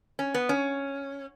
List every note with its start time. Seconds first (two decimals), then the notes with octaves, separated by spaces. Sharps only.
0.19 C#4
0.34 B3
0.49 C#4